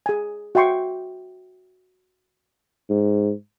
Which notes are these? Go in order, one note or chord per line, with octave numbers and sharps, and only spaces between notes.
G#4 G#5
F#4 E5 G5 C6 C#6
G#2